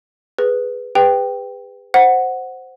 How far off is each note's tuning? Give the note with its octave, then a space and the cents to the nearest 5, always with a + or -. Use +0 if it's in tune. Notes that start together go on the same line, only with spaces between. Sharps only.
G#4 +0 B4 +0
G#4 -40 B4 +15 G5 +0
C5 +0 F#5 +0